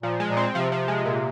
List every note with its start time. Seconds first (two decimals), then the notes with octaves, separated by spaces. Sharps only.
0.03 A#2 F3
0.20 G#3
0.29 A#2
0.37 C4
0.54 C3 F3
0.72 F3
0.88 G#3
1.05 A#2